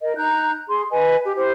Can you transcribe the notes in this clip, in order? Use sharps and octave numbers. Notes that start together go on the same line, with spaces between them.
A#4 D#5
D#4 A#5 F#6 G6
G#4 C6
B4 D#5 G#5
G4
E4 G4 C5